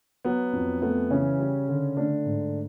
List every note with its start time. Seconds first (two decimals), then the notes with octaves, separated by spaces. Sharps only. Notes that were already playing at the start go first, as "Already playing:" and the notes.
0.25 F#3 B3
0.53 F2
0.82 A3 B3
1.10 C#3 E3 C#4
1.39 G3
1.68 D3
1.97 D3 A3 D4
2.26 G#2